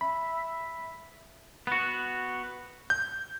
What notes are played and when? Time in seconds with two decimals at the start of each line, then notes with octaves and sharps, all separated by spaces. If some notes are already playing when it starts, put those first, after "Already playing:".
0.01 E5 B5
1.67 B3 F#4
2.90 G6